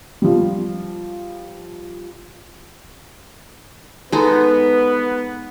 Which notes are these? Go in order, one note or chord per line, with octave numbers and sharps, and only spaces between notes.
F3 G3
G#3 B3 D#4 A4 B4